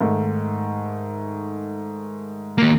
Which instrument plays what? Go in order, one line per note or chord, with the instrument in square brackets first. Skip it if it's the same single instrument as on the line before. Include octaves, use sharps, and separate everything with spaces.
[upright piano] G#2 D#3 A3
[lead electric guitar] D#2 A#3